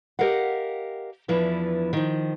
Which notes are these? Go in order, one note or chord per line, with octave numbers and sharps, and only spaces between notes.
G4 G#4 A#4 D#5 F5 F#5
E2 E3 F3 D4 E4 B4
D#3 F3